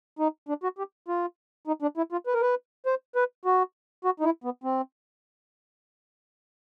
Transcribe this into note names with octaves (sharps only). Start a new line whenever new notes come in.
D#4
D4
F#4
G4
F4
D#4
D4
E4
F4
B4
A#4
B4
C5
B4
F#4
F#4
D#4
E4
B3
C4